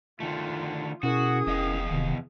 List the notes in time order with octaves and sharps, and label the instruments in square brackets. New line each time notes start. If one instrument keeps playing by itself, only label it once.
[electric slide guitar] D3 D#3 A3 [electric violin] F4
[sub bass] B2 [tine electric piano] C#4 E4 A#4 [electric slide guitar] F#4 [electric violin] G#4 D#6
[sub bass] F1 [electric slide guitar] E2 D#5 F5
[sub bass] D#1 [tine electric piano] C3 D#3